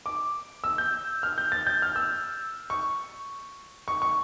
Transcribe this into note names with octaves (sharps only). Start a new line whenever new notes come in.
D6
E6
G6
F6
G6
A6
G6
F6
E6
C#6
C#6
C#6